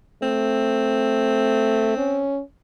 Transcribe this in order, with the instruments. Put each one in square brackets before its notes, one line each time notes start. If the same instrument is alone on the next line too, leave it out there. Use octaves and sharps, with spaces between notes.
[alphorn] A3 [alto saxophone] C4
[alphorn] C#4